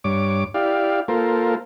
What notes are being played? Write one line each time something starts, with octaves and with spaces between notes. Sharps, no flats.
G2 C#5 D6
E4 G4 D5 F5
A#3 F4 A4 A#4 C5